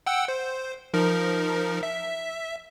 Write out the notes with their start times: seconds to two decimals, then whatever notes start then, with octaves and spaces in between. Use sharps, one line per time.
0.06 F#5 G5 E6
0.28 C5
0.94 F3 D#4 A#4
1.83 E5